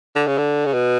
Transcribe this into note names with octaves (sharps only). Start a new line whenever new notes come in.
D3
C#3
D3
C#3
B2